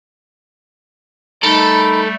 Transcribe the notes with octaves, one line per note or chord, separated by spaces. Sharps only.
G3 A3 D#4 A4 A#4 B5